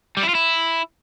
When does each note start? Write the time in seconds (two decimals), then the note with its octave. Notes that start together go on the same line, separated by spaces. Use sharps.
0.17 G3
0.23 E4
0.29 F4
0.35 E4